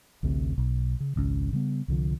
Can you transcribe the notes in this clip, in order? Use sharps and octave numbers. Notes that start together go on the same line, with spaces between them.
A1 D2 A2 C3
B1
C#3
G#1 C#2 C#4
C#3 G3 B3
C2 D3 F3